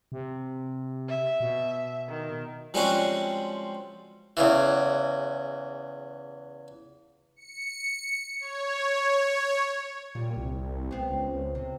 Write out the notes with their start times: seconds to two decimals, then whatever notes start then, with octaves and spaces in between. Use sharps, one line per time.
0.12 C3
1.09 E5
1.40 B2
2.08 D#3
2.74 F3 G3 G#3 C4 C#4 F#4
4.37 E2 C#3 E3
7.36 C#7
8.39 C#5
10.15 A#2 G3
10.37 C2
10.91 B3 C4
11.10 C#2
11.55 C3